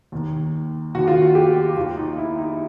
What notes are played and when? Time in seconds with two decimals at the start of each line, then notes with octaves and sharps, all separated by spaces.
0.12 D#2 D#3
0.95 D#2 D#3 F#4
1.07 F4
1.22 F#4
1.35 G4
1.76 D#2 D#3 F4
1.97 D#4
2.18 E4
2.38 D#4